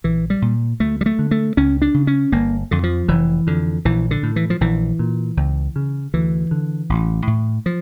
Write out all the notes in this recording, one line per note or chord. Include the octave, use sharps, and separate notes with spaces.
A#1 E3
G3
A#2
D2 A3
G3
A3
D3
A3
C#2 C#4
D4
C#3
C#4
G1 A#3
F2 D3
F3
F1 E3
F2 D3
A#1 E3
D3
A2
E3
F3
A#1 E3
A#2
C#2
C#3
D2 E3
D3
A1
A2
F3